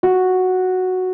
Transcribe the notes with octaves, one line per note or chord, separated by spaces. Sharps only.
F#4